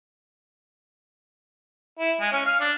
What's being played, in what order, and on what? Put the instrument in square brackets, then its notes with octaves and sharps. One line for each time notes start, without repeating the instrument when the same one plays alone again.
[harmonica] E4
G#3
C#4
F5
D4